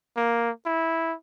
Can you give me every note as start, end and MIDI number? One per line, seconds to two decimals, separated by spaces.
0.17 0.50 58
0.66 1.15 64